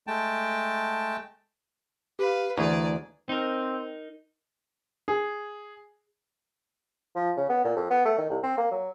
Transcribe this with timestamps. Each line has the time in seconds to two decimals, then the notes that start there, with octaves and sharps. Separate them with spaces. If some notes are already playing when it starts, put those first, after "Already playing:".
0.07 G#3 A3 G5 A5
2.19 G4 B4 F5
2.58 D2 E3 A3 G#4 D5 A#5
3.29 C4 D#4 A#4
5.08 G#4
7.15 F3
7.37 C#3
7.49 B3
7.64 A#2
7.76 F2
7.91 B3
8.05 A3
8.18 D#3
8.30 C2
8.43 C4
8.58 A#3
8.71 F#3